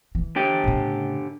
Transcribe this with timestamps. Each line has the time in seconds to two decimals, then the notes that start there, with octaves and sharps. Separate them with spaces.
0.15 E3
0.36 D3 G4
0.64 A2 C#3